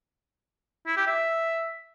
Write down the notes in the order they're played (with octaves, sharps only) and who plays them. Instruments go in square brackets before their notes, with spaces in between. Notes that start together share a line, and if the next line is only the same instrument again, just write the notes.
[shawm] E4
G4
E5